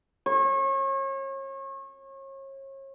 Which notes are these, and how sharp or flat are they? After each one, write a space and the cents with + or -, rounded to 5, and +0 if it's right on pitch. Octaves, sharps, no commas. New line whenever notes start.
C#5 -35